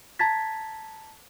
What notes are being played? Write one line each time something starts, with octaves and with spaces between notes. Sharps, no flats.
A5 A#5 G#6 A6 B6